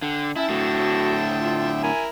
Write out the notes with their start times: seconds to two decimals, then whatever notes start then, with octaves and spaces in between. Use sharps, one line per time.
0.02 D3 G5
0.36 C#4 E4 E5 G5 A5
0.49 A2 D3 F#4
1.40 F4
1.83 E4 A#4 G#5